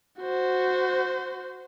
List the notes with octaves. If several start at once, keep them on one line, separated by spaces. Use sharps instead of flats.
F#4 C5